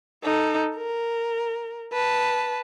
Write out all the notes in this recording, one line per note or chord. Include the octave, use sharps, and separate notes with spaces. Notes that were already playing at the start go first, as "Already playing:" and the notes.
D#4 A4
A#4
B4 A5